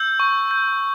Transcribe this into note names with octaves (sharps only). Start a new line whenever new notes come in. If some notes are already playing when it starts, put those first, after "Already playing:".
Already playing: E6 G6
C#6
G6